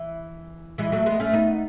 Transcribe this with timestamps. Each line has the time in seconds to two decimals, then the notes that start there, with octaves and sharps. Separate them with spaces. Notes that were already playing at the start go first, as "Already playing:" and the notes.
Already playing: E3
0.78 E3 G#3
0.92 F#3 A3
1.06 G#3 B3
1.20 A3 C#4
1.33 B3 D#4